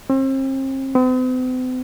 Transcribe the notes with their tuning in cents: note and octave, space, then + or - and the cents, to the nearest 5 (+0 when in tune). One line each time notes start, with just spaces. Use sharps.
C4 +40
C4 -45